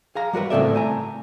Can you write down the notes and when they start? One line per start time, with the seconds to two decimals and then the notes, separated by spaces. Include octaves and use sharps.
0.15 G#4 F5 A#5
0.33 G3 F#4 A#4 B4
0.50 A2 C#3 C4 A4 D5 E5
0.74 A3 G#5 A#5